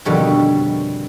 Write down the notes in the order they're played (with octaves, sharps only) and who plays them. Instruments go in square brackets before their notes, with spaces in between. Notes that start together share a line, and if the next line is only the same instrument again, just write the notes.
[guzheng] F2 B2 D3 D#3 G3 C#5